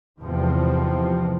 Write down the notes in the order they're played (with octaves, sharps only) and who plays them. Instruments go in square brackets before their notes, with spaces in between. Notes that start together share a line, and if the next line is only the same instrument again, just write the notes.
[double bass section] E2 G#2 C3 F3 C4